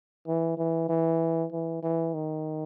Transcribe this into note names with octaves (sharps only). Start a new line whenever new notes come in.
E3
E3
E3
E3
E3
D#3